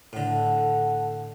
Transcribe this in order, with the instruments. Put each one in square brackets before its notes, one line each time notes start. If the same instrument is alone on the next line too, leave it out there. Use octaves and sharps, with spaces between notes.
[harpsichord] A2 D3 [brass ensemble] A4 F#5